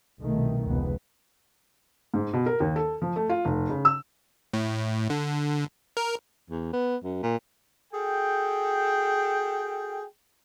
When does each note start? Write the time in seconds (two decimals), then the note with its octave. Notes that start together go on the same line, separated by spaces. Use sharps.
0.21 C2 B2 D#3 A3
0.67 F1 C#2 B3
2.14 G#2
2.33 B2
2.46 A#4
2.60 D#2
2.76 A4
3.02 F3
3.16 A3
3.29 F4
3.45 F1
3.69 C#3
3.85 E6
4.53 A2
5.10 D3
5.97 A#4
6.50 E2
6.73 B3
7.04 F#2
7.23 A#2
7.93 F#4 G#4 A4 G5